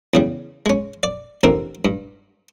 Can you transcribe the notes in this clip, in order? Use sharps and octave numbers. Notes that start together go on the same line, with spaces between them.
E2 C#3 G3
G#3 C#4
D5
A1 D3 C4 A#4
G2